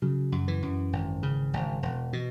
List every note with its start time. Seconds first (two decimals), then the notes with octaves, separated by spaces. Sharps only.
0.02 C#3 F#3
0.32 F#2
0.48 E3
0.63 F#2
0.93 G#1
1.23 C#3
1.53 G#1
1.83 E1
2.13 B2